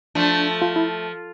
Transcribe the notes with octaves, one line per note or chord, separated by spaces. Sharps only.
F3 A3 D4
F4
E4